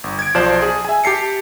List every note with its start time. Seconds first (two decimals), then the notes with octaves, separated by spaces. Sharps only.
0.04 G1
0.19 G#6 D7
0.34 B1 F3 C5 D5 A5 E7
0.62 G#4
0.85 E5 G#5
1.04 G4 A5 C7 C#7